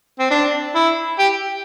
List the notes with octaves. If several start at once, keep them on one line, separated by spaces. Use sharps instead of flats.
C4
D4
E4
G4